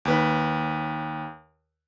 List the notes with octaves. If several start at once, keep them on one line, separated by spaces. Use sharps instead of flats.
D#2 B4